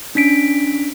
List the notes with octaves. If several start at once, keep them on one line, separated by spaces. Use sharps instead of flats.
C#4 D4 B6 D7